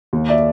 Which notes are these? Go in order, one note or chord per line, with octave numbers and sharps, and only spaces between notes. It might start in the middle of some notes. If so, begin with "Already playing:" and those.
D#2
D5 E5